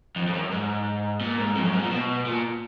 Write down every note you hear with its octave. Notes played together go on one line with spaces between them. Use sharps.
F2
F2
F#2
G#2
A#2
G#2
F2
F#2
G#2
A#2
B2
A#2